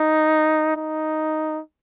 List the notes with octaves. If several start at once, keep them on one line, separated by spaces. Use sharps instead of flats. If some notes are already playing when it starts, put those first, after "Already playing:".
Already playing: D#4
D#4